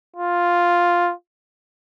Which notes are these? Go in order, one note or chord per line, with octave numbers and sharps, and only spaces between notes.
F4